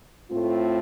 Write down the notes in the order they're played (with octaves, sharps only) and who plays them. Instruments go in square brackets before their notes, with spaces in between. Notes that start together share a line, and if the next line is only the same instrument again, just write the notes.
[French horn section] A2 A3 C4 F4